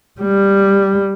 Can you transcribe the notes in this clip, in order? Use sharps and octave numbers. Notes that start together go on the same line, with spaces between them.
G3